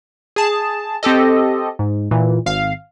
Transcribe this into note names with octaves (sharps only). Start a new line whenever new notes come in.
G#4 A5
C4 G4 A4 D#5
G#2
A#2 E3
G#1 F5